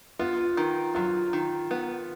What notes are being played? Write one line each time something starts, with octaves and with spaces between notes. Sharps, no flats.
B3 F4
D#3
F#3 F4
D#3
B3